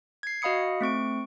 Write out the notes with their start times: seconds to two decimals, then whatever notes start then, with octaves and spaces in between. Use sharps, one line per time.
0.23 G#6 C7
0.42 F#4 D#5 F5 B5 D#6 C#7
0.81 A3 C4 C#6 D7